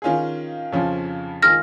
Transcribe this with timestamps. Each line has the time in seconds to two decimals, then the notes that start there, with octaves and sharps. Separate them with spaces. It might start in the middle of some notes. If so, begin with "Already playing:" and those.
0.02 D#3 C#4 F4 G#4
0.72 F2 C#3 F3 C#4
1.42 D#3 G#3 F4 G#4 F6 A#6